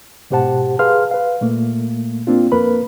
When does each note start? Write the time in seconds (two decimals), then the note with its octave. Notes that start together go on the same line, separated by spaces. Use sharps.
0.31 G#2 B2 G4 C5 F#5 A5
0.79 G#4 B4 F5 C6 F6
1.11 B4 F5
1.41 A#2 A3 A#3
2.27 A#3 C4 D4 F4
2.52 F2 A#3 A#4 B4 B5